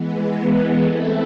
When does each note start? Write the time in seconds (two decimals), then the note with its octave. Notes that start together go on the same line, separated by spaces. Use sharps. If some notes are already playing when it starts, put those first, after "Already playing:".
Already playing: E3 G#3 B3
0.82 A3 C4 E4 A4